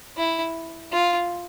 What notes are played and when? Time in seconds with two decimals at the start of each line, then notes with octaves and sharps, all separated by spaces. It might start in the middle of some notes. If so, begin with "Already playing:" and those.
0.17 E4
0.92 F4